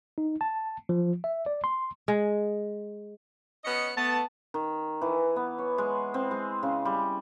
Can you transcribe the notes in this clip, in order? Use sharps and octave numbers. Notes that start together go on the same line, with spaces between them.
D#4
A5
F3
E5
D5
C6
G#3
B3 C#4 D#5 C#7
A3 B3 A5
D#3
E3
B3
C#5
G#3
C4
G#3
C#3
G3